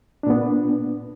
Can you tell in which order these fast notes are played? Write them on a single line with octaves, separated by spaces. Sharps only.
D4 A#2 B3